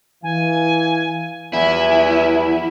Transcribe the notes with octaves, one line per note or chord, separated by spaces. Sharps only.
E3 F5 G#5
E2 F3 G3 B3 E4 G#5